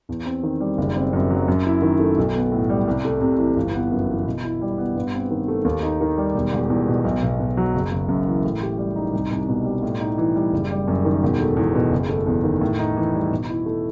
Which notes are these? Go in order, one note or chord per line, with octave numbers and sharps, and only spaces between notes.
E2
C4
D#3
G3
F#1
C4
F#2
F#3
F#2
E4
D#3
A3
B1
B3
A2
G3
C2
A3
C3
E3
G1
B3
F#2
E3
B2
E4
G3
B3
G2
C4
D#3
A3
D#2
D#4
D#3
G3
E1
E1
E2
B2
B1
B1
B2
F#3
F#1
F#1
F#2
E3
A2
G4
G3
D#4
C2
C2
B2
G3
A2
D#4
E3
G3
F#1
G3
F#2
D#3
E1
A3
E2
B2
F#1
A3
E2
D#3
A2
D#4
E3
G3
B2
E4
A3